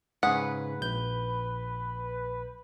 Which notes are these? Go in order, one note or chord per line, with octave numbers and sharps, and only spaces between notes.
G#2 C#3 G#4 B4 F#5
A#1 G6